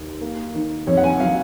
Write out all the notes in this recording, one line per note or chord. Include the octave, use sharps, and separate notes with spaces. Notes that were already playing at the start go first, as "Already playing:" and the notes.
Already playing: D#2
A#3
D#3
F2 C#5
F#5
G#5
F#3 F5